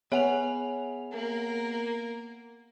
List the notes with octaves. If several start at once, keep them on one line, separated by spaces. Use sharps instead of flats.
B3 G#4 C#5 E5 F#5 G#5 F7
A#3 A#4